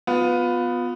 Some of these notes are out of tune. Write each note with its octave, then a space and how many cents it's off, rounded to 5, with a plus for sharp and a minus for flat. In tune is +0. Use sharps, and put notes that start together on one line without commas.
B3 +10 F4 +25